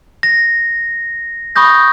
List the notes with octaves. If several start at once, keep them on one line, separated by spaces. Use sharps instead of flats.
A#6
B5 C#6 D#6 G6 A#6